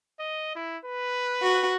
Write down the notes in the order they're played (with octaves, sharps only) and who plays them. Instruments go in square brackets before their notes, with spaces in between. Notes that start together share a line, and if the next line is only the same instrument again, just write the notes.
[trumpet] D#5
E4
B4
[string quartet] F#4